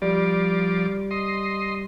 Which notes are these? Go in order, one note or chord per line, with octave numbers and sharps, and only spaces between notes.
F3 G3 D5
D#5 C6